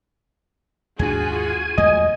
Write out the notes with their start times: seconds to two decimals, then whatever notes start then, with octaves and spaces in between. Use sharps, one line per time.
0.99 D#2 G#2 D4 F4 F#4 G#4 G#5
1.78 E2 G#3 A3 D#5